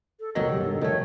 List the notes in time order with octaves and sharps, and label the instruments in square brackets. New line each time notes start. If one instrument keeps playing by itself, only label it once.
[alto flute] A4
[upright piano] F#1 D2 A#6 [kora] B2 D#3 F#3 [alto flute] A4
[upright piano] F#2 G3
G#2 D3
[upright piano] F1 [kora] D#3 A3 [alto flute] C#5